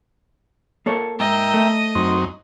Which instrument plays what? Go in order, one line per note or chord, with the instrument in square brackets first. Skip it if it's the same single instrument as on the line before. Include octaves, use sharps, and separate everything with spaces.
[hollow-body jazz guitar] A#3 A4 C#5
[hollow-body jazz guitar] G#2 [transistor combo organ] A#3 E5 G5 [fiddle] D#5
[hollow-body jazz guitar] A3
[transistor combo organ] F#2 C4 D#4